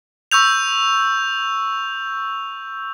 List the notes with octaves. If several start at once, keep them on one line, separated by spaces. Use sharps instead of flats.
C#6 E6 G6 F7